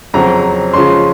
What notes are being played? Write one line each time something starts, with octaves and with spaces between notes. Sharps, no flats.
F2 C#3 F#3 C4 A#5
C#3 F3 G#3 C#4 C6